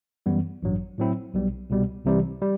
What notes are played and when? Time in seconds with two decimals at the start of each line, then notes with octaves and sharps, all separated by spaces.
0.26 F#2 E3 G3 B3
0.63 A1 G2 F#3
0.98 A2 F#3 C4 E4
1.34 B1 B2 G3
1.70 C2 B2 G3
2.06 C2 C3 E3 G3
2.42 G3